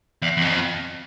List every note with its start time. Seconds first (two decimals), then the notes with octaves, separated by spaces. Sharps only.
0.22 E2
0.37 E2
0.42 F2